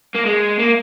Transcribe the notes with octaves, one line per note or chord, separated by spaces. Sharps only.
A#3
G#3
A#3